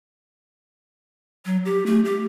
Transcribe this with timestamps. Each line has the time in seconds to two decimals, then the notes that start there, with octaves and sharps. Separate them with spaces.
1.46 F#3
1.65 G4
1.86 A3
2.05 G4